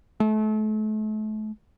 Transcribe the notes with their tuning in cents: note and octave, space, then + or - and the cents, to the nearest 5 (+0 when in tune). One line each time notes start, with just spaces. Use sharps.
A3 -35